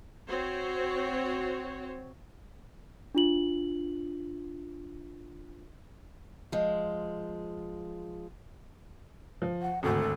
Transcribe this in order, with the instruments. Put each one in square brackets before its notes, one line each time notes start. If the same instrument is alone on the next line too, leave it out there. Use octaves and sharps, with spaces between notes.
[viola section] C4 F#4 C5 C#5
[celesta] D4 F4 F#7
[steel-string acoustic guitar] F3 G#3
[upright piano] F3
[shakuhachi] F#5
[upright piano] G#1 D2 [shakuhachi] A4